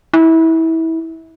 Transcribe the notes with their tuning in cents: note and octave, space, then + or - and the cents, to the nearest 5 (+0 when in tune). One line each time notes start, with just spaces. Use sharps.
E4 -25